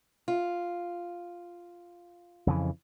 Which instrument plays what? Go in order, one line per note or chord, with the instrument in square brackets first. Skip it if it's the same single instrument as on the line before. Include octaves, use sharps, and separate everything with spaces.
[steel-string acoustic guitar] F4
[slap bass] F2 C#3 E3